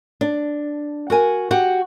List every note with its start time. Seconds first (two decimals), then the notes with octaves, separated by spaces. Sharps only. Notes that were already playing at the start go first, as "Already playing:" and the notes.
0.21 D4
1.10 F#4 A#4 G#5
1.51 F#4 G4 F#5